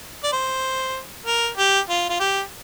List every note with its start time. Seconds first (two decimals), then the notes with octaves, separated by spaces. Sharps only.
0.24 D5
0.32 C5
1.26 A#4
1.58 G4
1.89 F4
2.09 F4
2.20 G4